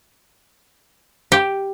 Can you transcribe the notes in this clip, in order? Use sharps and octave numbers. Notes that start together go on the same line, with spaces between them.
G4